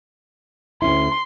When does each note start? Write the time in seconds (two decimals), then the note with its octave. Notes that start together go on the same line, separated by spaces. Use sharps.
0.82 D2 C#4 E4 C6